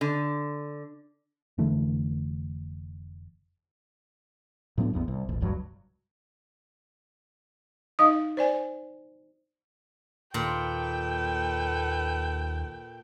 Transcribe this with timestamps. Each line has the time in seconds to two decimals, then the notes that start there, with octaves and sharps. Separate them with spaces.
0.01 D3
1.58 F1 D3 E3 A3
4.78 A2 F#3 B3 D4
4.93 A1 E2 B3
5.08 C2
5.29 D#1 A1
5.41 F1 C#2 G2 F#3
7.99 D#4 D#5 F5 D#6
8.37 C5 D5 G#5
10.34 D#2 A#2 A4 B4 G5